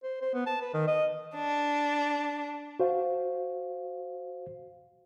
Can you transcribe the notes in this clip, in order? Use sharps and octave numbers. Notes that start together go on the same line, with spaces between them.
C5
C5
B3
A5
B4
D#3
D#5
D4
F#4 C5 F5